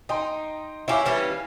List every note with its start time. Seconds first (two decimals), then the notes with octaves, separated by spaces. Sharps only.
0.09 D#4 D#5 G5 C6
0.88 E4 G4 C#5 F5 G#5
1.05 E3 G3 C#4